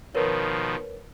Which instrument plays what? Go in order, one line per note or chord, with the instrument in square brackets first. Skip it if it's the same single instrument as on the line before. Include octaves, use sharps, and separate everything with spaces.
[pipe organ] B2 D#3 F3 [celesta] A#4 B4 C#5